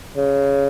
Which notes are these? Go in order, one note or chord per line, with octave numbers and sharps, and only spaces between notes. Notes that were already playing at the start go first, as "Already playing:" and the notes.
C#3